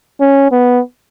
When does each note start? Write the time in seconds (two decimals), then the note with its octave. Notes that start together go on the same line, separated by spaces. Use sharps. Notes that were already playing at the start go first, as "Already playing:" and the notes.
0.20 C#4
0.51 B3